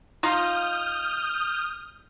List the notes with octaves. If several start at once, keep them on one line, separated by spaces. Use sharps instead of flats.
D#4 F4 D#6 F6 G6